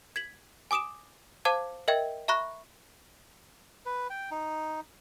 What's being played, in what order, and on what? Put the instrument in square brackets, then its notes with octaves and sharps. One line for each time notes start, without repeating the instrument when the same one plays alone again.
[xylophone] G#6 B6 F#7
G#5 D6 D#6 D7 E7
C5 F5 A5 D6 G#6
A#4 D#5 E5 G5 G#6
E5 A#5 B5 C#6 F#6 A#6
[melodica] B4
G5
D#4